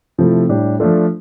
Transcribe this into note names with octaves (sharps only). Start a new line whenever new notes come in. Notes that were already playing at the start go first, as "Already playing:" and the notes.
C3 F3 A3 E4
A2 G3 D4 G4
F3 A3 D4 F4 A4